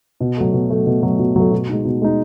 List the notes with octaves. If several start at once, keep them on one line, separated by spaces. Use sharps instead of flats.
B2
F#3 A3
B2
F#3 A3
B2
F#3 A3
B2
F#3 A3
B2
G#3 D#4
B2
G#3 D#4